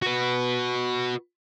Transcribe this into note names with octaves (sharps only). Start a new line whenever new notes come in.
F#4 B4